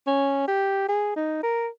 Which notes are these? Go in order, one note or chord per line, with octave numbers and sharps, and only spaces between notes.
C#4
G4
G#4
D#4
A#4